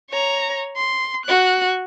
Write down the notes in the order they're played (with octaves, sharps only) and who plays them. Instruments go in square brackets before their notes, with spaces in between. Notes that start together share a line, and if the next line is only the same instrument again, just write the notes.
[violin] C#5 A#5
C6
F#4 F#6